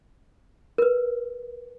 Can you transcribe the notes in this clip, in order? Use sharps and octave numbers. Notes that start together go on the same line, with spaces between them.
A#4 B4